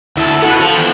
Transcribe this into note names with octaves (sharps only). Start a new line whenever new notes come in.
D2 E4 A4
B2 B3 E4 F#4 A4
F3
E2 E3 F3 G5